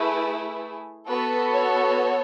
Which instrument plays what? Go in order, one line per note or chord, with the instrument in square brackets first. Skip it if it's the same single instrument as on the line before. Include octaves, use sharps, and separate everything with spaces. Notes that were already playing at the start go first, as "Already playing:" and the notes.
Already playing: [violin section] A3 E4 G#4 B4
B3 F#4 A4 B4
C#5